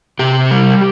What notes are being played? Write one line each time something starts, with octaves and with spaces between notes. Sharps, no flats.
C3 G4
G3